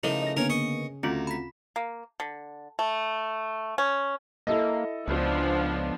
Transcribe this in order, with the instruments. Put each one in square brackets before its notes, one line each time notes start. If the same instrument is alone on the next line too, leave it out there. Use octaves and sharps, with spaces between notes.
[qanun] C#3 A3 [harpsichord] F3 D#4 [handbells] E4 A4 A#4
[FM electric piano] D#5 A#6
[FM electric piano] D3 A#3 B3 [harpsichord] C#4 A#4 [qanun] G#5 [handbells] D7
[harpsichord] D#5 C#6
[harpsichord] D2 [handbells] C4 C#4 F4 [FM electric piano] A#5
[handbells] B5 B6
[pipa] A#3
D3
A3
C#4
[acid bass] A#3 [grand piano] E4 A4 D#5
[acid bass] C#2 [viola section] F3 B3 D4